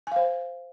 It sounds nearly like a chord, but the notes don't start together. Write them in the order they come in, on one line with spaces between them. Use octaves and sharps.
G#5 F5 C5